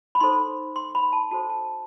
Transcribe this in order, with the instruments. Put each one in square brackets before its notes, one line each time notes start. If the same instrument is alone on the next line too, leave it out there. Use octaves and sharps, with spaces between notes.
[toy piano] B5
D#4 A4 C5 C6
C6
B5
A5
F#4 A4 C5 A5
A5